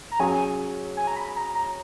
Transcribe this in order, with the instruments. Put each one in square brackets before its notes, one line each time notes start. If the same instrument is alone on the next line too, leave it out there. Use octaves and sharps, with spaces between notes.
[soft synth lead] A#5
[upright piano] F#3 C#4 G#4 [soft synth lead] G#5
[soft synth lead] G#5
A#5
B5
A#5
A#5